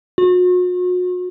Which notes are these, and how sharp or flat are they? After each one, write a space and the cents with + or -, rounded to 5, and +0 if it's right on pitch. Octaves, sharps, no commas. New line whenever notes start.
F#4 -40